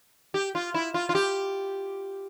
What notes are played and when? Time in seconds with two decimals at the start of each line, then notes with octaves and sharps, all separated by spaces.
0.34 G4
0.55 F4
0.74 E4
0.94 F4
1.09 F4
1.15 G4